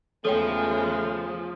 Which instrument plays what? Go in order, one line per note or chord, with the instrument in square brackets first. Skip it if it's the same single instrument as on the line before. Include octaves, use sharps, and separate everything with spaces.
[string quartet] E2 C#3 G#3 [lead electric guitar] F3 [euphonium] A3 [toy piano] A4 C#5 G5